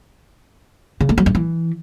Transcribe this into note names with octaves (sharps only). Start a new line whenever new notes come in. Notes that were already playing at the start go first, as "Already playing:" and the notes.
C#3
A3
F#3
G2
E3